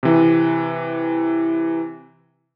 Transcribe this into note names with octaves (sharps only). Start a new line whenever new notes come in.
C3 E3